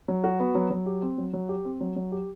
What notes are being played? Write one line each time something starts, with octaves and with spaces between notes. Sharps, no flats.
F#3
F#4
B3
F#3
F#3
G4
C4
F#3
F#3
G4
C4
F#3
F#3
G4